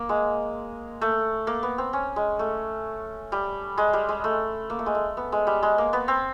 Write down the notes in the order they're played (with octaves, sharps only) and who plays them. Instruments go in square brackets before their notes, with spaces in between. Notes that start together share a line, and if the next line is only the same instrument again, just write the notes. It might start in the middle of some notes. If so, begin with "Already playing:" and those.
Already playing: [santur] A#3
G#3
A3
A#3
B3
C4
C#4
G#3
A3
G3
G#3
G3
G#3
A3
A#3
A3
G#3
A3
B3
G#3
G3
G#3
A#3
B3
C4